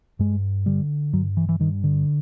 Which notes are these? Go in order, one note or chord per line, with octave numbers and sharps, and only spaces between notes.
G2 G#3
D3 G3
G2 F#3
E3
E3
G2 D#3
D3